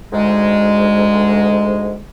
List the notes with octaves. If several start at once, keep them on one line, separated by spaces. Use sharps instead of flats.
D2 G#2 G#3